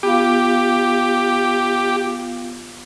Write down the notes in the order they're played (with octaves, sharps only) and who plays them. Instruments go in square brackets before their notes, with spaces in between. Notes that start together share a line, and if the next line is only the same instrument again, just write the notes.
[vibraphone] B3 F4 F5 [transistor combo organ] G4